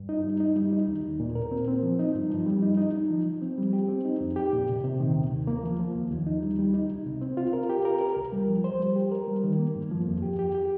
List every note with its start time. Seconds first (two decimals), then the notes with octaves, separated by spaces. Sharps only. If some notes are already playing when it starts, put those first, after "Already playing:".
Already playing: G2
0.09 D#4
0.24 G3
0.40 D#4
0.56 G3
0.73 D#4
0.88 D#2
1.04 D#2
1.20 A#2
1.35 A#4
1.51 C4
1.68 C4
1.83 F3
1.99 D#4
2.15 G2
2.30 F3
2.46 G3
2.62 D#4
2.78 D#4
2.94 D#4
3.10 F3
3.26 F3
3.42 C4
3.58 G3
3.73 G4
3.89 C4
4.05 D#4
4.20 F2
4.36 G4
4.53 A#2
4.68 C3
4.84 C3
5.00 D#3
5.16 D#2
5.32 C3
5.47 A#3
5.63 F3
5.79 F3
5.95 D#2
6.10 D#2
6.27 D#4
6.43 G3
6.59 G3
6.74 D#4
6.90 C2
7.06 C3
7.21 C4
7.37 F4
7.53 A#4
7.69 G4
7.85 A#4
8.01 A#4
8.16 C2
8.32 G3
8.49 F3
8.64 C5
8.80 G3
8.96 G4
9.12 A#4
9.28 G3
9.44 D#3
9.59 A#3
9.75 G2
9.91 F3
10.07 F2
10.22 G4
10.39 G4
10.55 G4